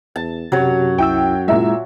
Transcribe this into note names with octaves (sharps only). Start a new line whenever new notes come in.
E2 A5
F#2 C3 F#3 G4 C#5
C2 E4 G5 E6
A#2 G#3 E4 E5 A#5